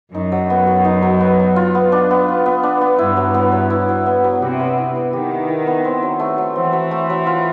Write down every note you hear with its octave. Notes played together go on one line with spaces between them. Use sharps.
F#2 D#4
F#3
B3
F#3
D#4
F#3
B3
F#3
F4
B3
D4
B3
F4
B3
D4
B3
G2 E4
F#3
B3
F#3
E4
F#3
B3
F#3
C3 G4
B3
E4
B3
D#3 G4
B3
E4
B3
C4
F#3
A3
F#3
E3 C4
F#3
A3
F#3
F4